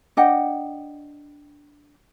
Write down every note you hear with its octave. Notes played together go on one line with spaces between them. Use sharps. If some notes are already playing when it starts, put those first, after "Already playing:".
D4 D#5 F#5 G5